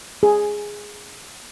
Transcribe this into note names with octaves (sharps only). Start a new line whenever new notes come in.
G#4